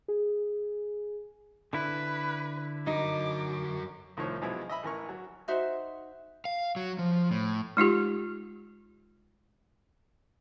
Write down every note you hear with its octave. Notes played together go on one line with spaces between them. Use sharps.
G#4
D3 E4 B4
F#3 D#4 A#4 D6
C2 A2 D#3 F3 C#5
B2 F3 F#3 G#3 E4
D#5 E5 B5
A1 E3 A#4 C#6
F#3
D#4 F#4 C5 E5
F5
F#3
F3
A2
G#3 D#4 F4 G4